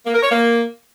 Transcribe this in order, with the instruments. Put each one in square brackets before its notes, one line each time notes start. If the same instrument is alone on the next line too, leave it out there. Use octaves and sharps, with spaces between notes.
[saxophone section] A#3
A#4
C#5
A#3